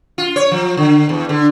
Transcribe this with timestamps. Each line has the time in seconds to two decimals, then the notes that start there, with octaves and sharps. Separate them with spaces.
0.18 F4
0.36 C#5
0.51 F3
0.77 D3
1.09 E2
1.29 D3